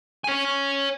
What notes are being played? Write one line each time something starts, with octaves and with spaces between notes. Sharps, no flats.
C#5 G#5